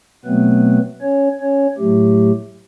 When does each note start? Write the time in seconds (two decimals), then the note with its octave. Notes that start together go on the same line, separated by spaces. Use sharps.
0.25 B2 F#3 A3 B3 C4 B4
1.01 C#4 C#5
1.40 C#4 C#5
1.78 A2 F#3 A3 G4